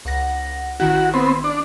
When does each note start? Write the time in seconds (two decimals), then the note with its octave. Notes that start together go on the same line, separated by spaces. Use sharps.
0.05 C#2 F#5 A#6
0.80 A1 D#3 E4 F#4
1.14 B3 C4
1.44 D4